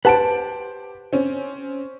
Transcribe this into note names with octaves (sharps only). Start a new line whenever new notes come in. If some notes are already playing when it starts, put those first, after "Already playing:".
G4 B4 C5 F#5 A5 D7
C4 C#4